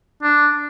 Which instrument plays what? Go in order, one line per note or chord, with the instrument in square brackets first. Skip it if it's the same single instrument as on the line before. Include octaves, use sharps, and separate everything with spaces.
[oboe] D4